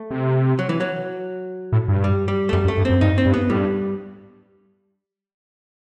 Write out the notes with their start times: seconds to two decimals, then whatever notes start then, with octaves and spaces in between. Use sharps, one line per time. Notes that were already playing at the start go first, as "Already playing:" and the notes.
Already playing: A3
0.11 C3
0.59 F#3
0.69 E3
0.80 F#3
1.72 A2
1.88 G2
2.04 G3
2.28 G3
2.49 A3
2.53 F#2 G3
2.65 F#2
2.68 A3
2.77 G2
2.85 F#2 C4
3.01 G2 D#4
3.18 C4
3.26 G2
3.34 B3
3.49 A2 G3
3.57 G2